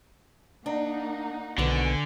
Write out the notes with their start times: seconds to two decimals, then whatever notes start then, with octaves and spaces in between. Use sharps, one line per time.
0.66 A#3 D4 D#4 F#5
1.58 B1 F2 D3 D#3 B3 F#4 G#5